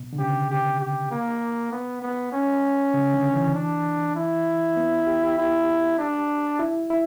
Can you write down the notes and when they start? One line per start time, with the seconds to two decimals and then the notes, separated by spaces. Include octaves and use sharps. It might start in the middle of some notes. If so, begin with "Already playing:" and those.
Already playing: B2
0.13 D3
0.19 C#3 G4
0.50 G4
0.80 G4
1.11 A#3
1.72 B3
2.02 B3
2.32 C#4
2.94 C#3
3.14 D3
3.34 E3
3.54 D4
4.16 E4
4.77 B3
5.07 G4
5.23 G4
5.38 E4 G4
5.98 D4
6.59 E4
6.90 E4